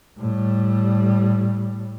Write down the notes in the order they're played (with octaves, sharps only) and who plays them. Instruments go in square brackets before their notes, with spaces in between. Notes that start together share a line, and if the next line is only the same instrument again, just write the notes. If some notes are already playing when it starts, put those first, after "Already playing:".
[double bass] A2 G3